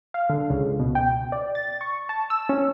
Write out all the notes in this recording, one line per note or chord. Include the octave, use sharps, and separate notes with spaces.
F5
D3
C#2
B2
G5
D5
A6
C#6
A5
E6
C#4